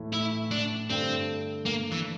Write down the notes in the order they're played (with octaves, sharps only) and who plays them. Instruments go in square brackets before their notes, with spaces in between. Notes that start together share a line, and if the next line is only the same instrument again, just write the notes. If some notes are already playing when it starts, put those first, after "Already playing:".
Already playing: [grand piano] A2 E3 A3
[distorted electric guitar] E4
D4
[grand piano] G2 D3 A3 D4 A4 [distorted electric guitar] C4
[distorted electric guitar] A#3
E3